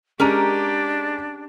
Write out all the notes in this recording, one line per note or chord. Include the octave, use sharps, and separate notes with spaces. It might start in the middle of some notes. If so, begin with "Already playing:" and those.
G#3 C#4 D4 G4 A#4 A#5 D#7